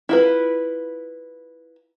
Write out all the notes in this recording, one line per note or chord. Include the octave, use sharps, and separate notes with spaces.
E4 F4 B4